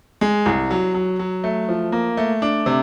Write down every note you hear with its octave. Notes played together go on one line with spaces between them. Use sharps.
G#3
C2
F#3
F#3
F#3
A3
F3
A#3
A3
D4
C3